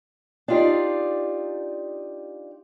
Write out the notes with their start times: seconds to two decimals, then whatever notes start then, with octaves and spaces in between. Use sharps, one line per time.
0.48 D4 D#4 F4 G4 D5